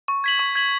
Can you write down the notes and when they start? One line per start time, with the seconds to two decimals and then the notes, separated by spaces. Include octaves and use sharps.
0.08 C#6
0.24 G#6 B6 F#7
0.39 C#6
0.55 G#6 B6 F#7